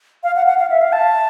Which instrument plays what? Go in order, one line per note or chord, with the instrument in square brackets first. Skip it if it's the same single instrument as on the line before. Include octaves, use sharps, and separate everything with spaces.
[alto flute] F5
F#5
F#5
F5
E5
F5
A5